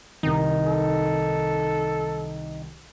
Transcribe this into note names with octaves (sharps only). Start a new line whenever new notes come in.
C2 D#3 D#4
A4